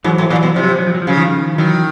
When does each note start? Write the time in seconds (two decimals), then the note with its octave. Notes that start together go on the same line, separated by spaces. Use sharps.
0.04 G#2 E3 F#3
0.18 A2
0.30 A#2 E3 F#3
0.43 B2
0.56 C3 F3
0.63 F#3
0.71 F3
0.79 F#3
0.87 F3
0.94 F#3
1.02 F3
1.07 C#3 F#3
1.17 D#3 F3
1.58 D#3 E3 F#3